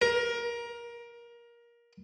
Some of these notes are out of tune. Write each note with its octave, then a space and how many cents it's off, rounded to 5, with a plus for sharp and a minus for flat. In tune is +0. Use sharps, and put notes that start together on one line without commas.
A#4 +20